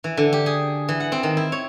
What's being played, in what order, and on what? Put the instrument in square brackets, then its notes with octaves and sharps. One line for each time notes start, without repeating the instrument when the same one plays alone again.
[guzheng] E3
D3
G4
G#4
E3
F#5
C4
D#3
E4
C#5